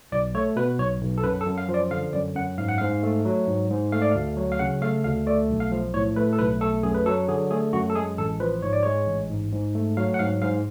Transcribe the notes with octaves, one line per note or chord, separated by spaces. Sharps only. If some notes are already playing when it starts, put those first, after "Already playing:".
B1 D5
A3 C#5
B2 B4
B1 C#5
B1
A4
F#2 B4
A4
F#2
F5
F3
D5
D3 F5
F#2 D5
F#2 F#5
G#2 F5
F#5
G#2 F5
A3
F#3
G#2
G#2
A3 F5
D5
D2 F5
F#3
F5
C#3 F#5
A3 F5
D2 F5
A3 D5
B1
F5
F3
A2 C#5
A3 B4
A4
B1 B4
A3 A4
F#2 G#4
B4
F#3 A4
D3 G#4
A3 G#4
F#2 F#4
A4
G#3 G#4
A1 A4
F3 B4
G#2 C#5
D5
G#3 C#5
A1
G#2
G#2
A3
F#3 F5
F#5
G#2 F5
G#2 F5